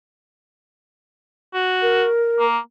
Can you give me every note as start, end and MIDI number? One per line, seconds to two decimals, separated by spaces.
1.54 2.06 66
1.82 2.46 70
2.40 2.58 58